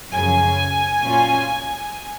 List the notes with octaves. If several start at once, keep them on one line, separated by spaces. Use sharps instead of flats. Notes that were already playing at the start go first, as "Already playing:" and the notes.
F#2 C#3 F3 G#5
A#2 F#3 C#4 F4